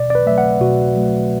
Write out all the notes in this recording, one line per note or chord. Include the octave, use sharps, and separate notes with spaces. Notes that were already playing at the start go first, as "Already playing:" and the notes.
Already playing: B2 D5
D5
B4
F#3 A3 E5
F#5
B2 F#4
F#3 A3